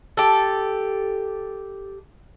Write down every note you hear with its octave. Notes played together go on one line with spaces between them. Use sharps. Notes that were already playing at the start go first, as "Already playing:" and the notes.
G4 A4